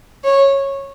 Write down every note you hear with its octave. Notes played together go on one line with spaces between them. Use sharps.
C#5